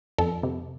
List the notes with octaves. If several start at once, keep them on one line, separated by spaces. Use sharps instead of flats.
F2 A4
C3